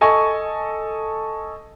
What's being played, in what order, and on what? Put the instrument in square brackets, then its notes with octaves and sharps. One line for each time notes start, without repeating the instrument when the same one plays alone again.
[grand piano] A4 D#5 G#5 C#6